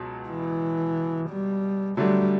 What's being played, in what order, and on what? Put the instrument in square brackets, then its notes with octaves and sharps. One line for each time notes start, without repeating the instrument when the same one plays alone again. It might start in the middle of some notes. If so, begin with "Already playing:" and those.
Already playing: [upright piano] C#2 B2 F#3
[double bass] E3
G3
[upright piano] D3 F#3 A3 D4 [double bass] G3